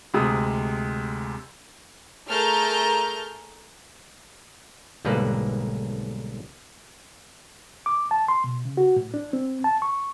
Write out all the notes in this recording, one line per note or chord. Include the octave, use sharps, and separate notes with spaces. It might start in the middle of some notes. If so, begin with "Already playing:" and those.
D2 C3 G#3 D#6
A3 G#4 A#4 A5 F6 G6
B1 G#2 D3 G3 A#3 B4
D6
A5
C6
B2
C#3
F#4
A2
D4
C4
A5
C#6